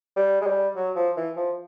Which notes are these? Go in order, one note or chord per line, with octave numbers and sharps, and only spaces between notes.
G3
G#3
G3
F#3
F3
E3
F3